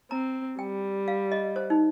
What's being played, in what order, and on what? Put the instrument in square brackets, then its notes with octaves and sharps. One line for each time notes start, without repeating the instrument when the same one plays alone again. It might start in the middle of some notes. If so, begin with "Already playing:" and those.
[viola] C4 [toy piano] A#5
[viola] G3 [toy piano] G5
[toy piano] F5
D#5
C5
D#4